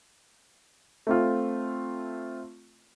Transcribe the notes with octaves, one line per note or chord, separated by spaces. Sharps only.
A3 C4 F4